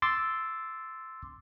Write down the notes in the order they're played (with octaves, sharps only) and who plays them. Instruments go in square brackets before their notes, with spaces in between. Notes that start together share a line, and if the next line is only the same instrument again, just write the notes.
[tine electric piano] C6 D6 E6 A6